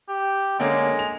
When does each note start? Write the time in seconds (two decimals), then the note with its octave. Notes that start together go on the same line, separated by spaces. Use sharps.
0.09 G4
0.60 D3 G#3 A#3 C#4
0.99 F7